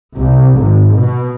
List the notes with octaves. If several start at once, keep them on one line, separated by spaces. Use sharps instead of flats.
C2
G#1
B2